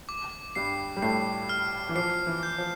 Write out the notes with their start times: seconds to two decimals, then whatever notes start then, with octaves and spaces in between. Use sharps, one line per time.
0.09 D6
0.55 G2 G3 C7
0.97 G3
1.02 A2 A3 C7
1.49 F6
1.89 E3
1.95 F3 C7
2.27 E3
2.43 G6
2.58 F3